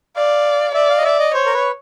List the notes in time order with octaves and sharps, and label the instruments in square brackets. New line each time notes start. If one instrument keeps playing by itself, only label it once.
[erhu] D5 [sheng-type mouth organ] F5
[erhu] D5 [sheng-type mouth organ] E5
[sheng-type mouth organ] F5
D#5
[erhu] D5 [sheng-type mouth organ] E5
[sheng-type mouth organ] D#5
[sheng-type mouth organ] C5 [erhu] C#5
[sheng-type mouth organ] A#4
B4